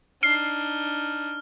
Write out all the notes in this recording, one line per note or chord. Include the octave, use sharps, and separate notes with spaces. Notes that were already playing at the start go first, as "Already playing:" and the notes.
D4 D#4 F6 C7